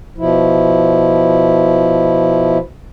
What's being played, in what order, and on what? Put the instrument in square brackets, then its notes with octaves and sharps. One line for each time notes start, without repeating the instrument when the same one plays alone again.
[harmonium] B2 F3 E4